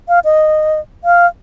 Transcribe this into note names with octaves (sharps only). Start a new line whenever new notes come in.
F5
D#5
F5